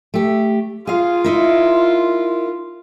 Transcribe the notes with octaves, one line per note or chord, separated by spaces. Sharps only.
A3 G4
F4 G#4 F5
D#4 E4 A#4